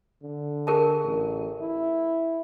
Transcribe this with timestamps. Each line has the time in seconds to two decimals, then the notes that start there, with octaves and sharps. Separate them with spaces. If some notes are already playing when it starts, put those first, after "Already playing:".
0.23 D3
0.67 G#4 A#4 A5
1.04 A1
1.61 E4